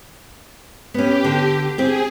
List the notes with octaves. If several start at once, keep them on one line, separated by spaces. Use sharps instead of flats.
B3 C#4 G4
D3
C4 G4 G#4